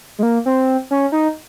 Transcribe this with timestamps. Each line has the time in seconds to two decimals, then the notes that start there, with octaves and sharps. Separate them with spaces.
0.19 G#3
0.23 A#3
0.46 C4
0.91 C#4
1.12 D#4